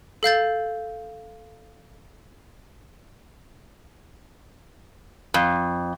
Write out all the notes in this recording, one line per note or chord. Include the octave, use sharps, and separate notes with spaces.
A4 F5 G6 A6
F2